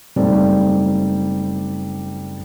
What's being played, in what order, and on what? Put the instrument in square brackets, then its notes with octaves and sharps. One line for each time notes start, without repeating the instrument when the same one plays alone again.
[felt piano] F#1 G3 A3 C4 D#4 D5